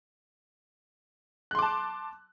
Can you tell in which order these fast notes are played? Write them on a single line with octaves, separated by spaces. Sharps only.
F#6 C6 D6 A5